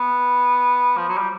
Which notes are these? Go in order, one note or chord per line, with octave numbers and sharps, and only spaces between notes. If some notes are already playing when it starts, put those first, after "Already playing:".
Already playing: B3
F3
F#3
G3